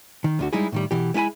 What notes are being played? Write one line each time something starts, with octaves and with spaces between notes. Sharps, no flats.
D#3
D2 D3 F#4
G3 G#3 D#4 E4 G#4
A2 D#3 G3
B2 E3 G4
G#3 E4 G4 G#5 B5